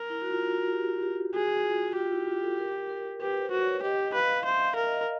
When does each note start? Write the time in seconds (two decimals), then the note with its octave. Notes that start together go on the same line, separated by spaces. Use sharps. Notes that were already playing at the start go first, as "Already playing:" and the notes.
Already playing: A#4
0.10 E4
0.22 F#4
0.30 F4
0.51 F#4
0.72 G4
1.03 G4
1.35 F#4 G#4
1.65 F4
1.85 F#4
1.96 F4 G4
2.12 E4
2.27 F4
2.42 A4
2.58 A#4
2.89 A#4
3.20 G4 B4
3.42 C5
3.51 F#4
3.62 C#5
3.82 G4 D#5
4.14 B4 F5
4.30 F5
4.44 C5 E5
4.65 F5
4.75 A#4
4.87 D#5